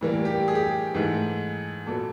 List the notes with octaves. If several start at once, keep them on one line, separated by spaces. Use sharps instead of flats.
A2 E3 G3 A#3
G4
G#4
G4
G#4
G#2 E3 A3
A#2 F#3 B3 A4